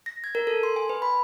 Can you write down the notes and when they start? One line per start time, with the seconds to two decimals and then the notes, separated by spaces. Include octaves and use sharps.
0.06 A#6
0.24 G#6
0.35 A#4
0.47 A4
0.63 C6
0.76 G#5
0.89 B4
1.02 B5